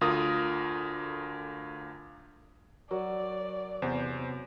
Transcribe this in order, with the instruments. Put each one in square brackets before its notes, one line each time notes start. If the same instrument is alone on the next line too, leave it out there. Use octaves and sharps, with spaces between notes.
[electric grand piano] D2 D3 F4 A#4 D#6
[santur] F#3 [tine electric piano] A#4 [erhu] D5
[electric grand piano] E2 C5 [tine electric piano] C3 B3 C4